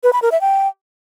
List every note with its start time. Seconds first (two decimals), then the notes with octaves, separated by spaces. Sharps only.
0.04 B4
0.13 B5
0.22 A#4
0.32 E5
0.41 G5